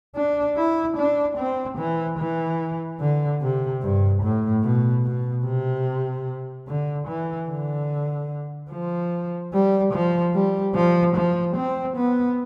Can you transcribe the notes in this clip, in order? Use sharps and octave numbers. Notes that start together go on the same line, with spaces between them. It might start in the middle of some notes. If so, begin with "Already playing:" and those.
D4
E4
D4
C4
E3
E3
D3
C3
G2
A2
B2
B2
C3
D3
E3
D3
F3
G3
F3
G3
F3
F3
C4
B3